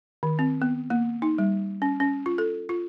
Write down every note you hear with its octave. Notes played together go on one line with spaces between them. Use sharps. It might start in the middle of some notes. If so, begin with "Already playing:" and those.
D#3
C4
B3
A#3
D#4
G3
C#4
C#4
F4
A4
F4